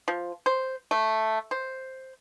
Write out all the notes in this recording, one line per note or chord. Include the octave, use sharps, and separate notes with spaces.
F3
C5
A3
C5